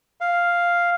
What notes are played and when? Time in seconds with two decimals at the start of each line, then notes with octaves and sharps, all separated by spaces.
0.21 F5